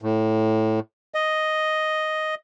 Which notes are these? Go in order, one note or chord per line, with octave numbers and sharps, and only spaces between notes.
A2
D#5